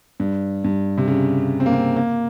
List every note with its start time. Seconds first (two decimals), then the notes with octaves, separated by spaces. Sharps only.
0.20 G2
0.64 G2
0.98 C3
1.08 C#3
1.60 C4
1.66 A#3
1.73 C4
1.96 A#3